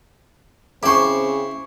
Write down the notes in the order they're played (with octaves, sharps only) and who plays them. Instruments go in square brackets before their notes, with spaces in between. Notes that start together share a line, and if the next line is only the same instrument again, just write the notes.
[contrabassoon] C#3 [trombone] C4 [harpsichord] E4 C5 [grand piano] C#6 D6